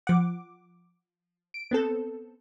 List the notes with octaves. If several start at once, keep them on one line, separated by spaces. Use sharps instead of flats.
F3 F#5 D6
D7
B3 C4 A4